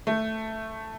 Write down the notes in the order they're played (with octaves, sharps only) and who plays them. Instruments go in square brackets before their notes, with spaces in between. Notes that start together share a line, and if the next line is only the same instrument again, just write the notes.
[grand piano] A3